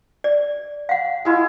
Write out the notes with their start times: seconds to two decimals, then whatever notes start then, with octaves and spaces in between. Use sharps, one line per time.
0.24 D5
0.89 F5 F#5
1.25 G#3 E4 F4